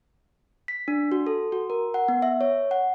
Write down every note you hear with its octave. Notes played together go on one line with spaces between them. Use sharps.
B6
D4
F#4
A4
F#4
A#4
F#5
B3
E5
C#5
F#5